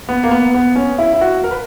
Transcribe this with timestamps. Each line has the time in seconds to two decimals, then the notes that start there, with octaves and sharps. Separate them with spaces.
0.09 B3
0.23 A#3
0.31 B3
0.54 B3
0.76 C#4
0.98 E4
1.13 E4
1.21 F#4
1.44 A#4
1.51 B4